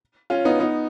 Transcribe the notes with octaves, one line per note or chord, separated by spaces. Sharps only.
C#4 F4
B3 D#4
B3 D#4